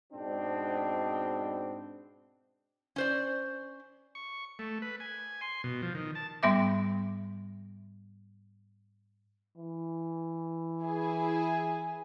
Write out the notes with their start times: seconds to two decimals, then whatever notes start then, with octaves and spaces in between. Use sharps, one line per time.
0.13 G#2 B2 C4 D4
2.96 C#4 C5 D5
4.15 C#6
4.59 A3
4.82 B4
5.00 G#5
5.41 C6
5.64 B2
5.82 F3
5.95 D#3
6.15 A5
6.43 G#2 G3 B3 E5 D6
9.58 E3
10.83 E4 G#4